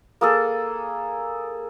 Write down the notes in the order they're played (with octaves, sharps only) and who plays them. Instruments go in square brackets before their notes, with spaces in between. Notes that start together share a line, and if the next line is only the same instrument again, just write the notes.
[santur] A#3 G#4 A4